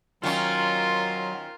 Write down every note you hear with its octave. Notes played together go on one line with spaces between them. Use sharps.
D#3 F#3 C#4 F4 A#4 C5